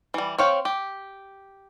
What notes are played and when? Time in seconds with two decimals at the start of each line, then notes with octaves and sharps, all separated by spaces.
0.14 E3 G3
0.38 C4 C#5 F5 G5
0.65 G4